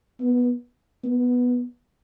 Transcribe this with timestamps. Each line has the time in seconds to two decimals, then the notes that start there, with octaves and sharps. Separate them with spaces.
0.20 B3
1.04 B3